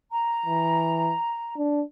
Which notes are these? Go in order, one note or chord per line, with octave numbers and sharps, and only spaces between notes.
A#5
E3
D4